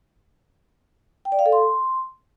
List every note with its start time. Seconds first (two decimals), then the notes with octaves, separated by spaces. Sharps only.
1.25 G5
1.32 D5
1.39 F5
1.46 A4
1.52 C6